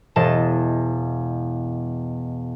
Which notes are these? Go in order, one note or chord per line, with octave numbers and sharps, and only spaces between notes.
E1 D#5 A5